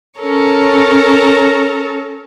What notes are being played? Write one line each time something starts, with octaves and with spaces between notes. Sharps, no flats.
C#4 A4 A#4 C#5